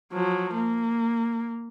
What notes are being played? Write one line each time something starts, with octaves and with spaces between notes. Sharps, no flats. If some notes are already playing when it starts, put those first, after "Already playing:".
F3 F#3
A#3